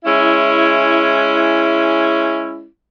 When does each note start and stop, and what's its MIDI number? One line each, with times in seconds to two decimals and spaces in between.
0.05 2.66 56
0.05 2.66 61
0.05 2.66 64